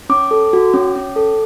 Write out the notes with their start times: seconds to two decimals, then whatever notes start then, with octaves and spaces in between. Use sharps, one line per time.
0.09 C#4 D6
0.31 A4
0.53 F#4
0.74 C#4
0.96 C#4
1.16 A4